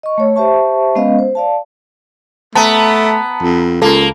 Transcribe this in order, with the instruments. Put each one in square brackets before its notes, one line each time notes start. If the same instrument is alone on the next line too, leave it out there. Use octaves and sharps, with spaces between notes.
[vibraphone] D#5 C#6
A3 C#5
G4 C5 E5 A5 C#6
G#3 B3 C#4 B4 D#5 F5
C5
D5 F5 A5
[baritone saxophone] A3 [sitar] B3 [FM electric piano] A5 A#5
[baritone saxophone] F2
[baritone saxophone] C#2 [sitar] A#3 [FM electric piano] A4